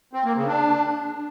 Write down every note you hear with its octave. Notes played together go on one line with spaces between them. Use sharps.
C4
A#3
C#3
D4